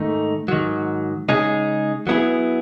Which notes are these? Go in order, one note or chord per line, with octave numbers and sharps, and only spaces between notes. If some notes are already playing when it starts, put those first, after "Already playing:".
Already playing: G#2 D#3 A3 D#4
G#2 D#3 F#3
C#3 G#3 D#4 G#4
F#3 B3 E4 G#4